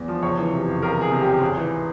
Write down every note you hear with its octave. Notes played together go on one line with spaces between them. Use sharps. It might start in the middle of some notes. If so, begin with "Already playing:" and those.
Already playing: E2
F3
C#2 C#5
E3
C3
C#2
C#2 A#4
E3 G#4
C3
G4
C#2
G#1 G#4
E3